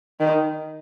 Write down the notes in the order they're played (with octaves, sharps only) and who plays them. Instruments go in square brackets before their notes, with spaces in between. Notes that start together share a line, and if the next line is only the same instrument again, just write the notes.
[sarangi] D#3